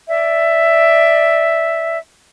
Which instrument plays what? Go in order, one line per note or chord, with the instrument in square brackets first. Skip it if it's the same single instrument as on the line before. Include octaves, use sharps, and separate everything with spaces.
[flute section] D5 E5